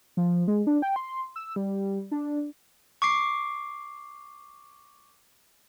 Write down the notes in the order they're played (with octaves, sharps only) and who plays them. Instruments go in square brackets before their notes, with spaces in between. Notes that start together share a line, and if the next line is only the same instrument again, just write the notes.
[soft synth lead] F3
G#3
D4
G5
C6
E6
G3
D4
[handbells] C#6 D6 C7